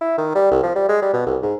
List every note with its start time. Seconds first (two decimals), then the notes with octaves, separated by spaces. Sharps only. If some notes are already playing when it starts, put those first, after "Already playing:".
0.01 E4
0.18 D#3
0.35 G3
0.51 C2
0.63 F3
0.76 G3
0.89 G#3
1.02 G3
1.13 B2
1.27 C2
1.43 G#2